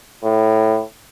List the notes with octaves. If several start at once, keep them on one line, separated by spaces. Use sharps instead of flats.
A2